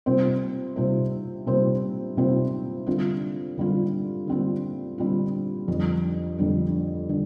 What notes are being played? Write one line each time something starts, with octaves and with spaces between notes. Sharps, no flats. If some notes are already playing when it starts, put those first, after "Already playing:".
C3 G3 C4 F4 C5
C3 G3 C4 F4 C5
C3 G3 C4 F4 C5
C3 G3 C4 F4 C5
D3 G3 C4 F4
D3 G3 C4 F4
D3 G3 C4 F4
D3 G3 C4 F4
F2 D3 G3 D4
F2 D3 G3 D4
D3 G3